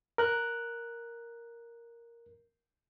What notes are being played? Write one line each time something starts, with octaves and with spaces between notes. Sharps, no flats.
A#4 F#6